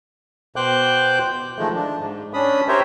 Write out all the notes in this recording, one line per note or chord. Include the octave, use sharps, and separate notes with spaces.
B2 C5 G5 D6 F#6 G6
D#3 F3 G#3 A3
D4
G#2
C#4 D4 B5 D#6
G4 A#4 C5 C#5 E5